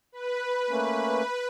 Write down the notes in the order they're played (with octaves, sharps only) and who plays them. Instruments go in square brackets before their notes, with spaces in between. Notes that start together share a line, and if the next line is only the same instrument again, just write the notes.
[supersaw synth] B4
[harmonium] A3 A#3 C#4